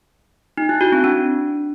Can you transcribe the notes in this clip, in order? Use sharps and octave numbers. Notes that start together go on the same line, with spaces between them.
D#4
E4
F#4
C4
D4